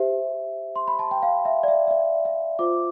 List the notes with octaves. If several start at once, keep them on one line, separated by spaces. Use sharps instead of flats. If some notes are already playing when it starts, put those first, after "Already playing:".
Already playing: G4 C5 E5
C6
B5
A5
G5
F5
E5
D5
E5
E5
D5
E5
F4 C5 D6